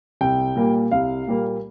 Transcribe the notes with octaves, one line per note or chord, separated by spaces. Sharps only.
C2 G5
A#2 G3 A#3
C2 F5
A#2 G3 A#3